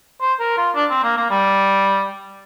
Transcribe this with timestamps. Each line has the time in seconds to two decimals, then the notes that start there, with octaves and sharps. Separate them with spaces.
0.21 C5
0.40 A#4
0.57 F4
0.75 D4
0.90 C4
1.03 A#3
1.17 A#3
1.30 G3